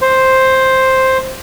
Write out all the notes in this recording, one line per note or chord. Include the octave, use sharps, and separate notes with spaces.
C5